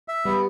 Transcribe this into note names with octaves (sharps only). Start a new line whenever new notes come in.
E5
G3 B3